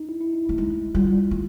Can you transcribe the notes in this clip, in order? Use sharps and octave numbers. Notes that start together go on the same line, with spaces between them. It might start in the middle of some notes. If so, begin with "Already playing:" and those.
Already playing: D#4
E4
E4
D#4
A3 E4
G#3
G3 F4
A3